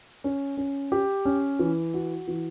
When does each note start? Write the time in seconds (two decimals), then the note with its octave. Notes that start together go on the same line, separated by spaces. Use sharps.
0.24 C#4
0.57 C#4
0.92 G4
1.25 C#4
1.59 E3
1.94 F#4
2.28 E3